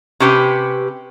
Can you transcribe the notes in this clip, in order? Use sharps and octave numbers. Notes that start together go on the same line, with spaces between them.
C3 C#4 G4 B4